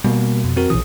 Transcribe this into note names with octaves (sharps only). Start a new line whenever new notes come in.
B2 G3 A3 A#3
F2
C4 F#4 A#4
A#1 B2 E3 D#6